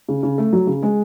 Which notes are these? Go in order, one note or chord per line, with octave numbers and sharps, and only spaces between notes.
C#3
C#3
A3
F#3
C#3
G#3